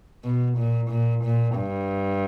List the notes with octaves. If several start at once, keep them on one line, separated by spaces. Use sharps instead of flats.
B2
A#2
A#2
A#2
G2